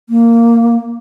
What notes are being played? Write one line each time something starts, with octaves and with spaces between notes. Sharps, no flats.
A#3